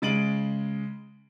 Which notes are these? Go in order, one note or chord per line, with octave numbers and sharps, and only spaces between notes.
C#3 G#3 A6 D7 D#7 F#7